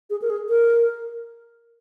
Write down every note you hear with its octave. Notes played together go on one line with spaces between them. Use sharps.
G#4
A#4
G#4
A#4